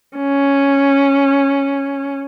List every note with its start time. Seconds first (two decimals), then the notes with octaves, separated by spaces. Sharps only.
0.18 C#4